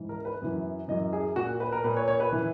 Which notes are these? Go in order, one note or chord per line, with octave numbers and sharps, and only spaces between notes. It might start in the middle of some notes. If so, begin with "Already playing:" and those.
Already playing: G#2 E3
A#4
B4
F#2 E3
F#2 E3 D#5
G#4
A#2 F#4
B4
A#4
A#2 B4
C#5
C#5
B4
E3